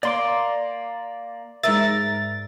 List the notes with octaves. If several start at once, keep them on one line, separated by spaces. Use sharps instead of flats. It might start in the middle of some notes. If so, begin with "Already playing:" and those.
A#3 D5 C6 D6
G#2 A#4 E5 A6